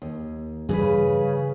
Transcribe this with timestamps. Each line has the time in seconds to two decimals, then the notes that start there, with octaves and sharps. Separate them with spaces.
0.02 D#2
0.69 G2 C#3 E3 G3 G#4 B4